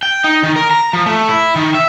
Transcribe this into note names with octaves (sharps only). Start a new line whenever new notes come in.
G5
D#4
D#3
A#4
A#5
F3
A3
E4
D#3
E5